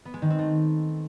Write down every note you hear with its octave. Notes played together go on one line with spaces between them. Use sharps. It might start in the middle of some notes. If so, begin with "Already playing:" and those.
B3
G#3
D#3
C4
A3